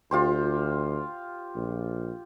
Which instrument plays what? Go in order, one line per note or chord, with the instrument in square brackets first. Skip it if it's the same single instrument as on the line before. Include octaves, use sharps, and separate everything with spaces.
[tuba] D2 [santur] F4 G4 C5
[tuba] A#1